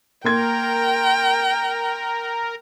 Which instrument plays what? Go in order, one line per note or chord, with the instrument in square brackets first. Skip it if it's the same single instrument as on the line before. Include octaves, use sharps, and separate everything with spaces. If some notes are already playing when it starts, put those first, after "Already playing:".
[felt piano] A#3 C6 G#6 [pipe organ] A#4 [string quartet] G5